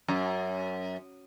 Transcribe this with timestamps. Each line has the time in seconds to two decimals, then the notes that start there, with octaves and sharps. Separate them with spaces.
0.08 F#2